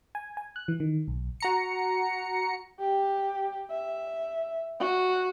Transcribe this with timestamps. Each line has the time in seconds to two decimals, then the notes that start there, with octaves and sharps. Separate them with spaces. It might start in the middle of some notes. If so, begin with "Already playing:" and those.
0.15 G#5
0.37 G#5
0.56 F#6
0.68 E3
0.80 D#3
1.08 B1
1.40 F#4 A#5 C#7
2.80 G4
3.71 E5
4.80 F#4